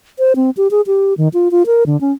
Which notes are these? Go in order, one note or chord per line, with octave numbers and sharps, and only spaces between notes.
C5
C4
G4
G#4
G4
D#3
F4
F4
A#4
D3
C#4